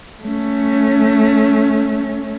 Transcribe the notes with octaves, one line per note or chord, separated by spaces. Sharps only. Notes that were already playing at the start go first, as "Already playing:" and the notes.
A3 C#4